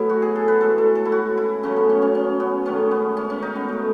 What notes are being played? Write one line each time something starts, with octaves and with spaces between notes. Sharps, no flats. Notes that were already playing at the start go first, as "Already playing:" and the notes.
Already playing: B2 F#3 A3 B3 C#4 E4
F#4
G#4
A4
B4
A2 G#3 A4
A4
A4
E4
F#4
E4
C#3 F#3 A3 C#4
B3
C#4
C#4
C#4
B3
G#2 D#3 A3 C#4
B3
C#4
C#4
D#4
B3
B2 A3